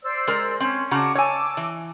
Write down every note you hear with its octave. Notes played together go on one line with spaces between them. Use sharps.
C5 D5 E6
G#3 A#4
C4 C#4
C#3 F#4 A5 A#5 D6
C#5 G#5 A5 D6 E6
E3